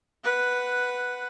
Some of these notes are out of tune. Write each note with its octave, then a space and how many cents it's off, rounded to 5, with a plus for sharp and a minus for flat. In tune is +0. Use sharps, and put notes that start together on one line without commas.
B4 +0 F#5 +0